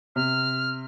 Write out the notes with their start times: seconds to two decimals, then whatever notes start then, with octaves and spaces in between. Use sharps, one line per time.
0.16 C3 F6